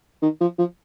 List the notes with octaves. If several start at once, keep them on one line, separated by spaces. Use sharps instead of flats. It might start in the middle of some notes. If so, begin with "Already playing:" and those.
D#3
F3
F3